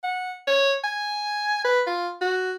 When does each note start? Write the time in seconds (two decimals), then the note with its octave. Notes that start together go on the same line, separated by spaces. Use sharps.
0.04 F#5
0.47 C#5
0.84 G#5
1.65 B4
1.87 F4
2.21 F#4